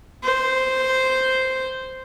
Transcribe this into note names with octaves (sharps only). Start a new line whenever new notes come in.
C5